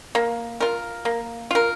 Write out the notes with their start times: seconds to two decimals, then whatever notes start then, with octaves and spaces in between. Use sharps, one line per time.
0.15 A#3
0.61 F4 A#4
1.05 A#3
1.51 F4 A#4